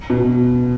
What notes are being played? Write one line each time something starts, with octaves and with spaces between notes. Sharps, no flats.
B2